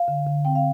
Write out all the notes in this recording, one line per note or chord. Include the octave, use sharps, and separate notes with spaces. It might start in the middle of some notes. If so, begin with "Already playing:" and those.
Already playing: F5
D3
D3
C4 G5
F5